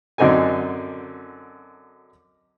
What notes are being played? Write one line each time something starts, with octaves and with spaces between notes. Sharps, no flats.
F#2 D3 C4 D#4 A4 G#5